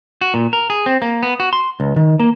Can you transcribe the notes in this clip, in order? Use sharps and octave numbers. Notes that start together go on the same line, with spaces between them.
F#4
A#2
A#4
G#4
C4
A#3
B3
F#4
C6
C#2
D#3
A#3